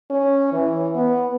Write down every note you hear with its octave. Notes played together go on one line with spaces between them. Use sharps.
C#4
E3
B3